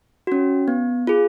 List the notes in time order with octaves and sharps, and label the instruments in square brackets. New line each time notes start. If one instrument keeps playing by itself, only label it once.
[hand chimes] C#4 F#4
B3
F4 G#4